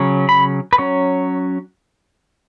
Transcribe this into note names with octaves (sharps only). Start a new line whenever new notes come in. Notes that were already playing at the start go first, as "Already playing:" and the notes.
Already playing: C#3 F#3 C#4
B5
B4
F#3 C#4 C#5